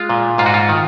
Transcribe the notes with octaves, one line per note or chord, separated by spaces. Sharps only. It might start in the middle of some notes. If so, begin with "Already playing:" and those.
Already playing: G#3 F4
A#2
G#2 F4
F#4
F4
D#3